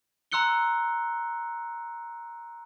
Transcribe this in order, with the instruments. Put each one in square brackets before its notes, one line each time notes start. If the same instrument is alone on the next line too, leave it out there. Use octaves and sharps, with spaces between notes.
[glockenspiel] A#5 C6 E6 F#6 C#7 G7